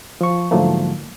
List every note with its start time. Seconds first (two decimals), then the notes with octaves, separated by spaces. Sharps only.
0.21 F3 C#6
0.51 G#2 D3 F3 F#3 A3 A#3